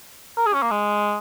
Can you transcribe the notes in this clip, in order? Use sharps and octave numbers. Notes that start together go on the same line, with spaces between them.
A#4
G#4
C#4
A#3
G#3